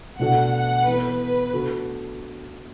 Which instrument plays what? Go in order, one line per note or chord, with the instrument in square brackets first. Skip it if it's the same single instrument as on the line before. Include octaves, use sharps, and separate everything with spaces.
[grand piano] B2 A3 D4 F#4 A4 [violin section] F#5
[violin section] F#5
[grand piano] E3 B3 E4 A4 [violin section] B4
[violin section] B4
[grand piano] D3 A3 F#4 A4